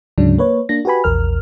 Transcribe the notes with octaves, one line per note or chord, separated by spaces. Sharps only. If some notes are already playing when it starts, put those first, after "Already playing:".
D2 G#2 C#3 F#3 D4
A#3 B4 C#5
A#3 D4 A#6
F#4 G4 B4 G#5 B5
A#1 E2 A#4 F6